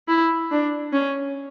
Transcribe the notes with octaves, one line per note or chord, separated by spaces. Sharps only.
E4
D4
C#4